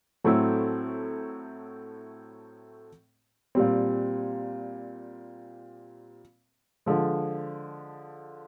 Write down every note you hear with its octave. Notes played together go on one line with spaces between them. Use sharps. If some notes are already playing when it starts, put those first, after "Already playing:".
A2 F#3 A3 C4 E4
A#2 G3 C4
D3 F3 G#3